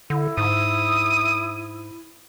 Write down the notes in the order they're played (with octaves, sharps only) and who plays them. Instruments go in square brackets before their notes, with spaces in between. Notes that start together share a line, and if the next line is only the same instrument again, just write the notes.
[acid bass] D3 [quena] E4
[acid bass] G#2 [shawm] D#6